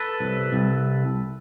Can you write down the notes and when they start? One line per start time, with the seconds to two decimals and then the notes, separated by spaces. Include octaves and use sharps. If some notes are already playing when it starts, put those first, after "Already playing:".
Already playing: A4 B4
0.20 C2
0.53 C2